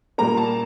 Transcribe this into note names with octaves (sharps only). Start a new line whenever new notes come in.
A#2 G3 A#3 A#5
A5